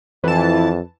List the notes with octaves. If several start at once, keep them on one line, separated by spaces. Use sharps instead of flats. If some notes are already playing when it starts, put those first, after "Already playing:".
F2 E3 A5